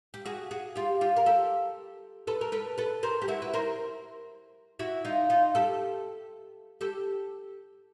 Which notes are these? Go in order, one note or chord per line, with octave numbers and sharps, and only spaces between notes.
G4
F#4 G#4
F#4 G#4
F4 G4
F4 G4
A#4
G4 A4
A4 B4
A#4
A4 B4
A4 B4
A#4 C5
G4
E4 F#4
B4
A#4 C5
E4 F#4
D#4 F4
D#4 F4
G4 A4
G4 A4